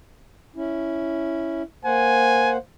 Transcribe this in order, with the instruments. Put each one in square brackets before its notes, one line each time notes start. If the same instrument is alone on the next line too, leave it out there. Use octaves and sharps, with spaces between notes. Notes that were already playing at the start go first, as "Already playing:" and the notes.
[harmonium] C#4 E4
[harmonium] A#3 C5 F#5 [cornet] G#5